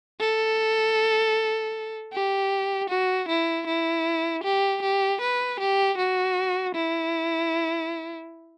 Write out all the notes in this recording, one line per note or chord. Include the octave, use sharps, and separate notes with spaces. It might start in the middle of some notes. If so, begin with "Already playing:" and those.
A4
G4
F#4
E4
E4
G4
G4
B4
G4
F#4
E4